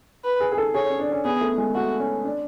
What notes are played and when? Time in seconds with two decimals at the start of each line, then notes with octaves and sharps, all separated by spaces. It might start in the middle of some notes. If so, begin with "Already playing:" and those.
0.24 B4
0.40 G#4
0.52 G#4
0.58 A4
0.74 G#4 C#5
0.90 C#4
0.99 D4
1.12 C#4
1.25 B3 G#4
1.41 A3
1.58 G#3
1.75 A3 F#4
2.00 C#4
2.25 D4